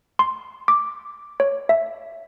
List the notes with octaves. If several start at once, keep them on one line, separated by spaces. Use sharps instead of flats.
C6
D6
C#5
E5